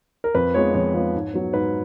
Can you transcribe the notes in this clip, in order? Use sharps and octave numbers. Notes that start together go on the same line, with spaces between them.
A#4
F2 B4
F3 G#3 B3 C#5
F2 C#5
F3 G#3 B3
G#2
F#3 B3
G#2 B4